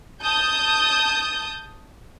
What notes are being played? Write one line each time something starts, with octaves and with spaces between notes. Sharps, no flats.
A5 D#6 G6